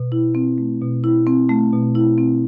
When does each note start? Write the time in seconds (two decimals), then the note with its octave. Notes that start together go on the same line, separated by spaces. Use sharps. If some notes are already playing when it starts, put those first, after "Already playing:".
Already playing: B2
0.12 E4
0.35 C4
0.58 A3
0.81 B2
1.04 E4
1.27 C4
1.49 A3
1.73 B2
1.95 E4
2.18 C4